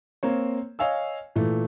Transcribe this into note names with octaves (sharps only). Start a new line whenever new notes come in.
A#3 C4 C#5
C#5 D#5 F5 G#5 E6
A#2 E3 A3